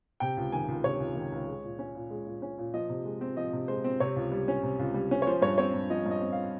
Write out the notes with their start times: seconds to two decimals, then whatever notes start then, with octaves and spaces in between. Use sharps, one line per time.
0.20 C3 G5
0.37 C#2
0.52 D#3 G#5
0.68 C#2
0.84 C3 C#5
1.00 C#2
1.15 D#3
1.32 C#2
1.48 G#3
1.64 A#2
1.79 C#4
1.95 A#2
2.11 G#3
2.27 A#2
2.42 C#4
2.58 A#2
2.74 F3 D#5
2.89 C3
3.05 G#3
3.21 C4
3.37 F3 D#5
3.53 C3
3.68 G#3 C5
3.84 C4
4.00 C3 C#5
4.16 C#2
4.32 G3
4.48 C#4
4.63 C3
4.79 C#2
4.94 G3
5.11 C#4
5.22 C#5
5.27 F3 C5
5.42 G2 C#5
5.58 C4 C#5
5.73 G2
5.90 F3 D#5
6.06 G2
6.11 D#5
6.21 C4
6.32 F5